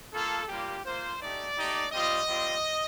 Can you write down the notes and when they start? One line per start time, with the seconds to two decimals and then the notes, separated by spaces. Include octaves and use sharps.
0.12 A#3 F4 A4
0.48 G3 A#3 F4 G4
0.84 A#3 F4 C5
1.20 A3 D#4 G4 D5
1.55 A3 D#4 G4
1.92 G3 C4 F4 D#5
2.27 G3 C4 F4